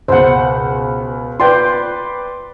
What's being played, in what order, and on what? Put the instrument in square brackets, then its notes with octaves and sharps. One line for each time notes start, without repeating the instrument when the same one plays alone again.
[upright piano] C#2 B2 [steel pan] C5 F#5
[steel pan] F4 G5 [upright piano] B4 D5 C6